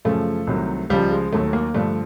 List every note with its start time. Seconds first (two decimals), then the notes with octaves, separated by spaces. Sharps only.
0.05 F#2 C#3 F3 A3
0.47 C2 C3 D#3 F#3
0.90 C#2 C#3 F3 G3
1.11 G#3
1.32 D#2 D#3 F#3 A3
1.53 A#3
1.74 G2 D3 F3 A3